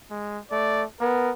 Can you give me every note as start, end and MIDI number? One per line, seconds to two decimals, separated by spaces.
0.11 0.40 56
0.51 0.85 57
0.51 0.83 74
1.00 1.32 59
1.00 1.31 70